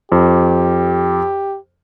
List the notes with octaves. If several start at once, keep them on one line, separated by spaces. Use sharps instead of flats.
F2 G4